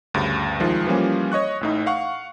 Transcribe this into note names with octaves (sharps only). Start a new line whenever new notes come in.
D2 G2 C#3
C2 D#3 F3 G#3
E3 F3 G3 A#3 C#4
C#5 D#5 C#6 F#6
A1 A2 D#4
F5 F#5 C#6